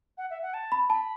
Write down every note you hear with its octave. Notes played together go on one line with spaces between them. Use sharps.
F#5
E5
F#5
A5
B5
A5 B5